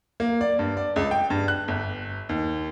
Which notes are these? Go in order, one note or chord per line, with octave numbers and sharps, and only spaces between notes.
A#3
D5
G2
D5
C#2
G5
G2
F#6
G1
D#2